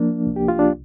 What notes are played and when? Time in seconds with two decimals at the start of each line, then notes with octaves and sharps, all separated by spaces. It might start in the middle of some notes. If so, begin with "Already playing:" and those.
Already playing: F3 A#3 D4
0.27 C2
0.36 G4
0.48 F4
0.59 D4